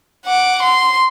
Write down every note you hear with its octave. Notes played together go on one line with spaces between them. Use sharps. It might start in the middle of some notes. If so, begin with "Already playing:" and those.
F#5 D6
C6